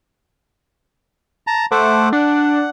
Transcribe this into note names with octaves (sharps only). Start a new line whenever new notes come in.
A5 A#5
A3 C5 F#5 D6
D4 F#5